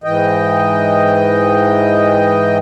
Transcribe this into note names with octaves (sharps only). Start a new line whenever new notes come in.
G#2 E3 D#5 G5